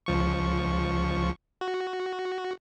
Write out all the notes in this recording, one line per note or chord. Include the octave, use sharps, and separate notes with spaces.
C#2 F3 C#6
F#4